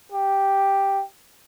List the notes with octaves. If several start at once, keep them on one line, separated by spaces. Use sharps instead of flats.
G4